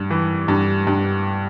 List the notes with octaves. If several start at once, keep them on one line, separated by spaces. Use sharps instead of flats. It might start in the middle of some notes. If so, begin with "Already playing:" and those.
Already playing: G2
E3
G2
G2